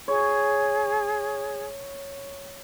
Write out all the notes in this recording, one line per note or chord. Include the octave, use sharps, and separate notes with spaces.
G#4 C#5